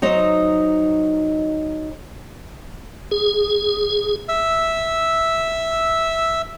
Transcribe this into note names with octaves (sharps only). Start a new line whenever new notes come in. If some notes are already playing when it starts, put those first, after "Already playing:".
F#3 D#4 C5 D#5
G#4
E5 E6